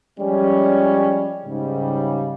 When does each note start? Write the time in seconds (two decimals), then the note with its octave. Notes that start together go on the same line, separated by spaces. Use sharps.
0.19 F3 G3 G#3 C#4
1.44 G#2 C#3 G3